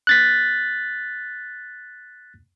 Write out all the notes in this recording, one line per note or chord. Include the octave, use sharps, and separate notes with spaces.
F#6 A6 B6